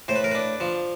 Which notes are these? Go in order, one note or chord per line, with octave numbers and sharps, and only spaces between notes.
A2 C5
B4
A#4
D4 B4
F3